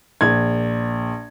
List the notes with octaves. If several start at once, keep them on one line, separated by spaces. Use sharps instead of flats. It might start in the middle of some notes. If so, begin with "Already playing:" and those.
A#1 G#6